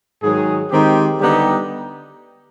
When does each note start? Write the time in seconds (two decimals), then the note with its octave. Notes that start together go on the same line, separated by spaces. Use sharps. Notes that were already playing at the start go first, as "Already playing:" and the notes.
0.22 G#2 D#3 F#3 G#4
0.71 D#3 G#3 C4 D#4 G4
1.20 D3 G3 B3 D#4 G4